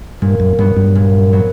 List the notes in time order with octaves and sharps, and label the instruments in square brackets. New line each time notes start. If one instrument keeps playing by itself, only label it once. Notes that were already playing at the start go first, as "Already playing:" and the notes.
[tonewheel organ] G2 [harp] A#2
[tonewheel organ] F#2
[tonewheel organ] G2 [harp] F#3 B3
[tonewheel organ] G2
[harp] A#2
F#3 B3